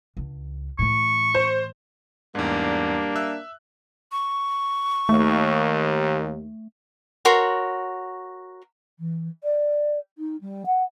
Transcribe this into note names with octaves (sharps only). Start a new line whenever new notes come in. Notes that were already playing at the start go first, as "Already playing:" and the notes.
C#2 D4
A2 E3 C#6
C5
E2 G#2 G3 A#3 D4
E5 E6 F#6
C#6
D#2 A3
F#4 A#4 C#5 C6
E3
D5
D#4
G3
F#5